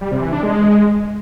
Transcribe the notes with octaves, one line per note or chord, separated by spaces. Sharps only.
G3
C3
E3
D4
G#3